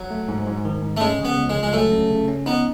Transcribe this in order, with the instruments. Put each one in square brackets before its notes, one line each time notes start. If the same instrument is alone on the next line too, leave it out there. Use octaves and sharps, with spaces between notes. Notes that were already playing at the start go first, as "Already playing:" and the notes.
Already playing: [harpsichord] F#3
[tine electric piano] A3
G#2
G#2
D#3
G#2
[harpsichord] A3
[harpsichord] G#3 [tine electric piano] C#4
[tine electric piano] C#3
[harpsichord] B3
[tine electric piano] C#2
[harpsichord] G#3
[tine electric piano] C#2
[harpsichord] G#3
[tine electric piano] F#3 [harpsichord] A3
[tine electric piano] C#4
C#3
C#4
[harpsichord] B3 [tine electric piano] D#4